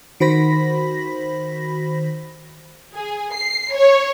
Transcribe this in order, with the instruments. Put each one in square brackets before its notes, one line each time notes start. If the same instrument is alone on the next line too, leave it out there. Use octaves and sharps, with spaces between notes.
[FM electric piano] D#3 F#4 C5 B5 A#6 B6
[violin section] G#4
C7
C#5